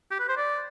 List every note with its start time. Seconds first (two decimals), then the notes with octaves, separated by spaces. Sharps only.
0.11 G4
0.19 B4
0.29 C5
0.37 D5